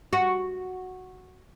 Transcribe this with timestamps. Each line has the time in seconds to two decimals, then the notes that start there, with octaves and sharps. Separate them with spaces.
0.13 F#4